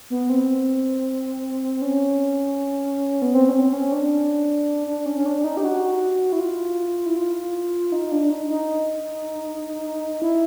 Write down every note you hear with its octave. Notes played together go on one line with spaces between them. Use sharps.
B3
C4
C#4
B3
C4
C#4
C4
C#4
D4
D4
C#4
C#4
D4
D#4
G4
F#4
E4
F4
E4
F4
D#4
D4
D#4
D#4
E4